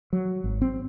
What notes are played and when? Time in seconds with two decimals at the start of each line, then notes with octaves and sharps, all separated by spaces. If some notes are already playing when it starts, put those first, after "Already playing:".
0.13 F#3
0.44 G#1
0.62 C4